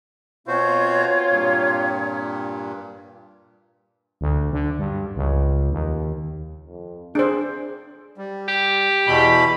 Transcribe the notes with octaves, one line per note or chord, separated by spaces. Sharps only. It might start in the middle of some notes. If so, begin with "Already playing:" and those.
B2 C4 F4 F#4 C5 C#5
G2 A#2
D2
D3
G2
C#2
D#2
F2
D4 G#4 C5
G3
G4
E2 B2 B5